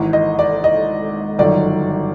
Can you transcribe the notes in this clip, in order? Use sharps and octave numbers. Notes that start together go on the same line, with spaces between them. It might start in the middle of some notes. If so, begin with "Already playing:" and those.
Already playing: G#1 G#2 E3
D#5
D5
D#5
G1 F#2 D#3 F#3 D5